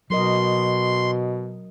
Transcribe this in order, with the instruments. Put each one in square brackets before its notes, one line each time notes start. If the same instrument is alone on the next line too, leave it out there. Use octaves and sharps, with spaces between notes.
[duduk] B2 [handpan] F#3 A#4 D#5 [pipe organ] C6